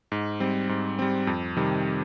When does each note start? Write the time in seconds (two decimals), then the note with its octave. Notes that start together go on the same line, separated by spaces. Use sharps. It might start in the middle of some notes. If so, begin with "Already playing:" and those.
0.12 G#2
0.40 G3 C4
0.69 G#2
0.99 G3 C4
1.27 F2
1.57 C3 D#3 G3